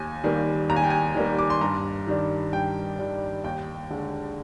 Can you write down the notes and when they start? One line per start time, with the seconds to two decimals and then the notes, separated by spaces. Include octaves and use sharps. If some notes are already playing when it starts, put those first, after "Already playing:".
Already playing: D#2 G#5
0.24 D#3 G3 A#3
0.69 D#2 A#5
0.76 G#5
0.84 G5
0.90 G#5
1.15 D#3 G3 A#3
1.38 D6
1.50 C6
1.61 G2 A#5
2.07 D#3 G3 D4
2.53 G2 G5
2.99 D#3 G3 D4
3.44 D#2 G5
3.90 D3 G#3